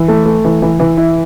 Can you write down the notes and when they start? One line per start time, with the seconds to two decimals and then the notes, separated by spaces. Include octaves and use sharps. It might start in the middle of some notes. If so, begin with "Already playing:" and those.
Already playing: E3
0.08 A3
0.25 A3
0.44 E3
0.62 E3
0.80 E3
0.97 E4